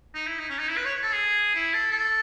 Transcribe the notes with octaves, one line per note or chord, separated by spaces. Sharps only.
D#4
E4
D#4
C#4
D#4
E4
B4
C#5
A4
G#4
E4
A4
A4